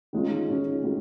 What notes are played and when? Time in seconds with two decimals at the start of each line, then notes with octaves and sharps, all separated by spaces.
0.13 D#3 G#3 C#4 F4
0.48 D#3 G#3 C#4 F4
0.84 D#3 G#3 C#4 F4